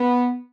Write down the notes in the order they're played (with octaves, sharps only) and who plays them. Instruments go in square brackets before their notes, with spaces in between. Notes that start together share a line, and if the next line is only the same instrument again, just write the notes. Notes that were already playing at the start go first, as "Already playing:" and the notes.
Already playing: [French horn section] B3